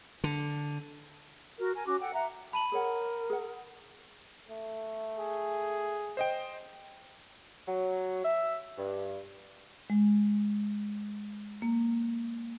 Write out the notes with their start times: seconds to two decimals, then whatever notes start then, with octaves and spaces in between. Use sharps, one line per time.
0.24 D3
1.59 F#4 A#4
1.74 A#4 G#5
1.86 C#4 F#4 D6
2.00 A4 F#5 G5
2.14 E5 F#5 A#5
2.53 A5 B5 D#7 F#7
2.72 G#4 A#4 C#5 F#5
3.30 G#4 F#5
4.49 A3
5.18 G#4
6.17 C5 D#5 G5
7.67 F#3
8.24 E5
8.77 G2
9.90 G#3
11.62 A#3